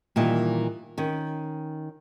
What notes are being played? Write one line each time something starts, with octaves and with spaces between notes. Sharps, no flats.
A#2 D#3 E3 G3
D#3 C#4